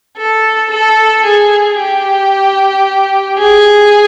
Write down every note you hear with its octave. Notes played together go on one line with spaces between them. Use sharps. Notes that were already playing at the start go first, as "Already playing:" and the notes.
A4
A4
G#4
G4
G#4